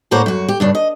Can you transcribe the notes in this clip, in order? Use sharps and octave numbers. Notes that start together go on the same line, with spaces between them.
D2 A2 A#3 C5 C#5 F#5
F#2 F#4
G4
G2 C#3 D4
D#5